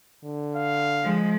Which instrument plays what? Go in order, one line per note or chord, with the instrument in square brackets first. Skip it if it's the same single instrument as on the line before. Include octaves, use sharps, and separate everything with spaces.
[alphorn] D3
[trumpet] F5
[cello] F3 G#3